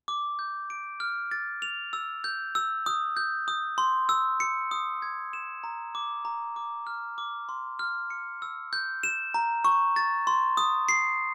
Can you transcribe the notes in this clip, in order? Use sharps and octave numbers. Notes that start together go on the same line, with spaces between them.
D6
G6
D7
F6
A6
F7
E6
G6
E6
D#6
G6
D#6
C6
E6
C#7
D#6
G#6
E7
A#5
D6
A#5
D6
F6
D6
C6
F6
C#7
E6
G6
E7
A#5
C#6
A6
C6
D#6
C7